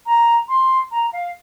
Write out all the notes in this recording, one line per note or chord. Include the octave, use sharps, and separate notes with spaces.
A#5
C6
A#5
F5